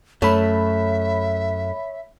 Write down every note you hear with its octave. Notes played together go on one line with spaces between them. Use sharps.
F#2 A3 C#5 E5 B5